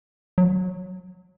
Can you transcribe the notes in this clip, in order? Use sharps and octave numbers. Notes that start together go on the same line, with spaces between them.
F#3